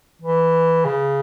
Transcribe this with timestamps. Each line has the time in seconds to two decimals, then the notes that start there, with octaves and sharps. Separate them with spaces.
0.22 E3
0.85 C#3